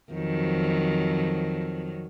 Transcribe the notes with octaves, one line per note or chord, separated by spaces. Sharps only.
F2 D#3 F#3